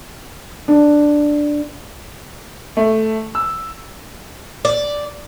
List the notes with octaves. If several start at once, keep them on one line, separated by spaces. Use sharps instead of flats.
D4
A3
E6
D5